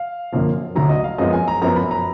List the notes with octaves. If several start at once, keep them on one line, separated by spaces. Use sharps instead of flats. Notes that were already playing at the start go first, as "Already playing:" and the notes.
Already playing: F5
F#2 D3 F3 A#3
D2 D3 F#3 A#5
D#5
F5
F#2 F3 G#3 B3 D#5
G#5
A#5
F#2 F3 B3 A#5
B5
A#5